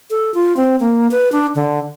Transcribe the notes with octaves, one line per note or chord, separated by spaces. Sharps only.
A4
F4
C4
A#3
B4
D4
D3